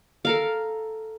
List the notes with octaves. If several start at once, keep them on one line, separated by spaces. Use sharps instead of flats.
A4 A#4 F5